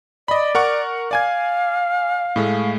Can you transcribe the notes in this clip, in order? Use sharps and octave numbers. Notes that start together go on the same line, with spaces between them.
D5 D#5 B5
A#4 F#5 C#6
D5 F5 G#5 G#6
A2 G#3 A3